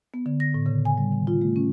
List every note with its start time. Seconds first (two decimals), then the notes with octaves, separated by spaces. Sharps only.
0.14 B3
0.26 D3
0.40 A#6
0.54 A2
0.66 C#3
0.85 G#5
0.98 G3
1.12 D#3
1.27 F4
1.41 A3
1.56 C#4